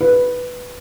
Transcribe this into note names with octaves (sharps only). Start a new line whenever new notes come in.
B4